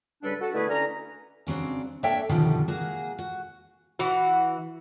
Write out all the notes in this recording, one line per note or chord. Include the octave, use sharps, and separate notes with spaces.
G2 C#3 G3 D4 A4 B4
F#4 A4
B2 D3 A3 E4 G#4 B4
D3 C#4 A#5
C#3 F#3 C4 D4
A#3 D4 A4 C#5 E5 G5
F#2 B2 D3 D#3 F3 G3
A#3 F#4 G#4
F#4
E3 F#4